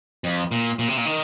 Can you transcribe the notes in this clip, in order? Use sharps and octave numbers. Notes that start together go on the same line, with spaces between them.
F2
A#2
A#2
C3
A#2
D#3